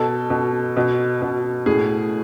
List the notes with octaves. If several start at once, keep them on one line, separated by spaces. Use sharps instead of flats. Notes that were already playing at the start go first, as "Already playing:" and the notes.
Already playing: B2 A4
B2
B2
B2
A2 G#4